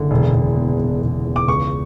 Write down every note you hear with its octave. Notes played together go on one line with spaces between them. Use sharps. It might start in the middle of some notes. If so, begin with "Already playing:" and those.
Already playing: F#1 D3
E1
E1
E2
E1
E1
E2
D6
C#2 C#6